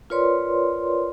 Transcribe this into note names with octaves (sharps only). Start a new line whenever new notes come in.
F4 A#4 B4 C#5 D5 C6